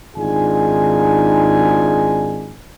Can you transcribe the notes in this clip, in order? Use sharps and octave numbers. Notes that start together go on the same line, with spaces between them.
G#1 D4 D#4 F4 G#4 G#5